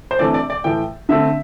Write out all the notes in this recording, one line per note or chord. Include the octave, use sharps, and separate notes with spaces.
C5
C3 E3 A3 D4 D5
D5
D5
A2 E3 A3 G5
D3 A3 C4 E5